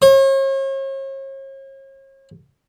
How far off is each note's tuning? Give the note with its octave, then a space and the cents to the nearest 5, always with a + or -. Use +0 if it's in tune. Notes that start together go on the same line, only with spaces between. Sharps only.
C#5 -40